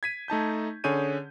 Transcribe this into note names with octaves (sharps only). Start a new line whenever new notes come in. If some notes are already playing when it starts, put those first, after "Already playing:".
G#6 B6 D#7
A3 D#4 A5 G6
D3 C#4 G#4 C#5 G6 D#7